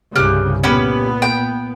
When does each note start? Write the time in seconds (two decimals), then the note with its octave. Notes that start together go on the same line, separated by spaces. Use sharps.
0.16 C2 G2 C#3 G4 F6 F#6
0.63 A#2 B3 C#4 G4 B4
1.22 G5